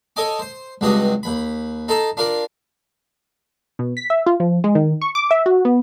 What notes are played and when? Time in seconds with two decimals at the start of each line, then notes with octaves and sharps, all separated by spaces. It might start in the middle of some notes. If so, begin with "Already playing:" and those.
0.16 A4 C#5 D#5 G#5 D6
0.39 C5
0.81 C#2 G2 C4 F#4 G4 D#5
1.23 D#2 B5
1.88 D#4 A4 A5 A#5 C6
2.17 D4 F4 A#4 D5
3.79 B2
3.97 B6
4.10 E5
4.26 F4
4.40 F3
4.64 G#3
4.75 D#3
5.02 C#6
5.15 D6
5.31 E5
5.46 F#4
5.65 B3